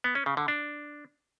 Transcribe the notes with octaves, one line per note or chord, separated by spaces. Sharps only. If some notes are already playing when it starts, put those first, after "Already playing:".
B3
C#4
C#3
D3
D4